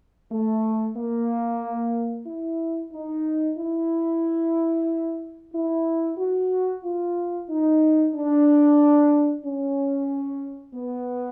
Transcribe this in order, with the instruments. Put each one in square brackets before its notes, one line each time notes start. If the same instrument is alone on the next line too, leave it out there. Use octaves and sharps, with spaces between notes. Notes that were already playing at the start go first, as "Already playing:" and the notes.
[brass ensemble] A3
A#3
E4
D#4
E4
E4
F#4
F4
D#4
D4
C#4
B3